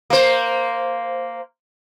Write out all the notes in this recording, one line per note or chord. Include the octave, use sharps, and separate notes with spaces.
A#3 C5